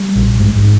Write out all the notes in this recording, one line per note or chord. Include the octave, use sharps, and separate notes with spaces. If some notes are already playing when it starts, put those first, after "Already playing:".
Already playing: G3
A#1
G#2